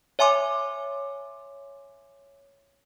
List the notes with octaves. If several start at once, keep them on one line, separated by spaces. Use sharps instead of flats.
C#5 E5 G#5 C6 D6